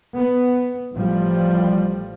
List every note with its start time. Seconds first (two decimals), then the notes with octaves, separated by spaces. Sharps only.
0.17 B3
0.93 A1 F3 G3